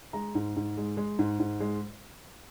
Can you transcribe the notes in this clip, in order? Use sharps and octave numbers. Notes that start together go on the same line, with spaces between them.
G#3 A#5
G#2
G#2
G#3
G#3
G#2
G#2
G#3